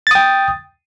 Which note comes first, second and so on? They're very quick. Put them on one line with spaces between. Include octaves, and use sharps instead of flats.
A6 D#6 G5